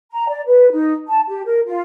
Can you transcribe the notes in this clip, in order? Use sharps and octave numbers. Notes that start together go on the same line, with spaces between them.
A#5
D5
B4
D#4
A5
G4
A#4
F4